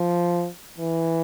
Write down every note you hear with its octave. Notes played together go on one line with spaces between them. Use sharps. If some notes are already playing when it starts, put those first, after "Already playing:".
Already playing: F3
E3